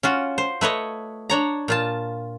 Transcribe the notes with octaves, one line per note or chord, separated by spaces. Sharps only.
C#4 F4 F#4
C5
A3 B4 C#5 D#5
D4 C#5 A#5
A#2 F4 A5